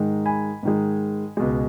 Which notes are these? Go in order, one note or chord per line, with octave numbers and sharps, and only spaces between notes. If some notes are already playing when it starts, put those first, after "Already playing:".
Already playing: G#2 D#3 G#3
G#5 B5
G#2 D#3 G#3
C#2 B2 G#3